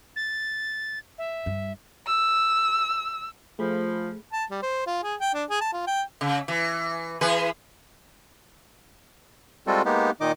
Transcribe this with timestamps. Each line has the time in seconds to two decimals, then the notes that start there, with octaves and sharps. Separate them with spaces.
0.16 A6
1.18 E5
1.46 G2
2.06 E6
3.59 F3 A3 G#4 B5
4.33 A5
4.51 G3
4.62 C5
4.87 F4
5.03 G#4
5.20 G5
5.34 D4
5.50 G#4
5.61 A5
5.73 F4
5.87 G5
6.21 C#3
6.48 E3
7.21 E3 G#4 B4
9.67 G3 G#3 C4 F4 F#4 A4
9.85 G#3 A#3 B3 D#4 G4
10.21 A#2 D#3 D#4 D#5 D6